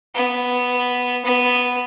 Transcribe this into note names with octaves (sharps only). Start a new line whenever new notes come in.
B3
B3